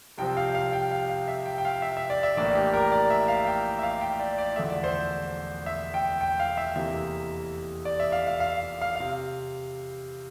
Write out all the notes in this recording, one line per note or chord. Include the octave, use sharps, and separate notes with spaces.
C2 C3 F3 C4 G5
F5
F5
G5
F5
F5
E5
G5
G5
F5
E5
E5
D5
E5
A#1 A2 E3 A#3 D4 D5
G4
A#4
D5
E5
F5
G5
E5
F5
G5
D5
D5
E1 E2 D3 F3 A3 E5
D5
C5
E5
G5
G5
F5
E5
F1 E2 C3 E3 A#3 E5
D5
E5
F5
F5
F5
F5
C3 F5